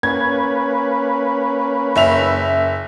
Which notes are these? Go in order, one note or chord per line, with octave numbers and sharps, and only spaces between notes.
A#3 C#4 B4 G#6
F#1 E5 F7